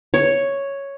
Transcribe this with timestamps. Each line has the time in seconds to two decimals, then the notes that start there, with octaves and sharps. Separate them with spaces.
0.14 C#5